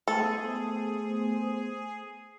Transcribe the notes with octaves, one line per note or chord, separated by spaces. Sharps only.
A3 B3 G#4 A4 C5